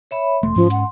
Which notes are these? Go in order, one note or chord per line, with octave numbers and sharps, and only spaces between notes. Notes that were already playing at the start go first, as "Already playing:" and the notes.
C#5 E5 B5
E1 A3 C6
G#2 F3 C#4
F#5